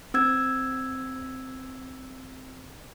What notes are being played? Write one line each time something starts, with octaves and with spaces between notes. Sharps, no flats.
C4 E6 G#6